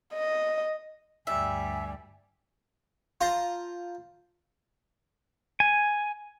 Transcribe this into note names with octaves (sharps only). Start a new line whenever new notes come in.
D#5
D2 G2 G3 E5 G#5
F4 C5 A5 A#5 C6
G#5